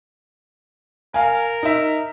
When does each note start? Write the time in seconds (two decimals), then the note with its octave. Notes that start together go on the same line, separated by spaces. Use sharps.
1.14 A#4 F5 G#5
1.63 D#4 E5